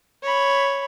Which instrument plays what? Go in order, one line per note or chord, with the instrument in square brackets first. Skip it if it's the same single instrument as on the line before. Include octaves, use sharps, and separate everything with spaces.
[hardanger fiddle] C#5 B5